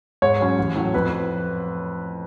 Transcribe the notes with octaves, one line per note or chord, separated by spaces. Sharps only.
G#2 C#5
F#3 C#4
A1
A2 F#3
F2 B4